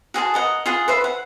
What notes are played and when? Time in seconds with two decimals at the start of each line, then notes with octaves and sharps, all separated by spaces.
0.14 F#4 G#4 C5 A5
0.34 A#4 D#5 F#5
0.66 F4 G#4 F#5
0.88 B4 C5 E5
1.04 F#5